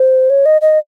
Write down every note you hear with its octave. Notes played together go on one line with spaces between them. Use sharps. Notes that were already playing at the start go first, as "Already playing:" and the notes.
Already playing: C5
C#5
D#5
D#5